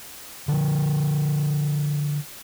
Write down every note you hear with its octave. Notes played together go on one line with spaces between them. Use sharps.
D3 F3